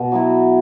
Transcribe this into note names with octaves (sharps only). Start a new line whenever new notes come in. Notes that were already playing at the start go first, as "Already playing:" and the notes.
Already playing: B2
F#3 B3 E4